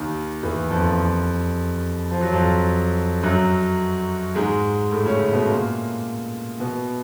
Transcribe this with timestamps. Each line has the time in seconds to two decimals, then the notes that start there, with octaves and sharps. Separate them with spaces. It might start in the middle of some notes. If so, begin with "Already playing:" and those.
Already playing: D#2 D#3
0.43 E2 E3
0.70 F2 F3
2.11 F3
2.21 F#3
2.32 F2 F3
3.23 F#2 F#3
4.35 G#2 G#3
4.91 A2 A3
5.06 C#3 C#4
5.33 B2 B3
5.47 A#2 A#3
6.59 B2 B3